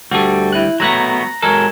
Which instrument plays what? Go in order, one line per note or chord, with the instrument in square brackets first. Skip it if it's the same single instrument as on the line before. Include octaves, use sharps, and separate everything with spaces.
[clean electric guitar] D2 G3 [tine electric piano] F#4 A4
[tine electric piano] E4 F#6
[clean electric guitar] F#3 A3 B3 [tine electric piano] A#5 F#6 A#6
[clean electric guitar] F#3 G#3 A4 [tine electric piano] A#4